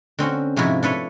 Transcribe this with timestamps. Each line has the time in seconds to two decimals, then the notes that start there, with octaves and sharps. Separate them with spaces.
0.19 D3 C4 C#4 F#4
0.56 G#2 C3 F3 E4 F#4
0.83 D4 A4 B4 C#5